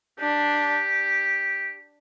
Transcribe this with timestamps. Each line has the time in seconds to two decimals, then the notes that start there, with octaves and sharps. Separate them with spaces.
0.19 D4 G4